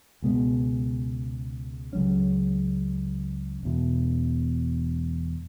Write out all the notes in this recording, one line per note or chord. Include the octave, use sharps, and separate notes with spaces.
C#2 B2 G#3 B3
C#2 C#3 F#3 C#4
E1 E2 B2